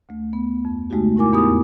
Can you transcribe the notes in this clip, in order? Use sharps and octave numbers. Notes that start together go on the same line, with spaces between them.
D2 A3
B3
F2
C#3 G#3 A3 D#4 F#4 G4
A2 E4 A#4 G#5 D6
E2 B3 D#4 G4 D#6